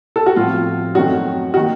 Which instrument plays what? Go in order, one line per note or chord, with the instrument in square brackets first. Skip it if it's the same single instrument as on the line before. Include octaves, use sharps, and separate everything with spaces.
[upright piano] A4
F#4
A2 F3 C4 F4
F#2 D#3 A3 C4 F#4
D#3 A#3 F#4